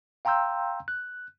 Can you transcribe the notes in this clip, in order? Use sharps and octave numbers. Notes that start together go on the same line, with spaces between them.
F5 G5 A#5 C6 E6 G6
F#6